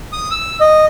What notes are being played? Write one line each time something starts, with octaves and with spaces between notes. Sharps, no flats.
D#6
E6
D#5